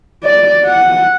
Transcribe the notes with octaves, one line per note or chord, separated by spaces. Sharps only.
D5
F#5